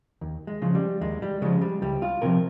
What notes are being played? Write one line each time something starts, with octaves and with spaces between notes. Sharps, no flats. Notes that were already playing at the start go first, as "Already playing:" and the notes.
D#2
G#3
C#3 F3
G3
D#2 G#3
G3
C#3 F3 G#3
G3
C#2 G3
F4
C3 F3 A#4